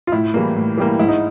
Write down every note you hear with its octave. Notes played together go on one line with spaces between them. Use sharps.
F4
A2 E4
E3 G3 A#3
A2
E3 G3 A#3
G#2 E4
D#4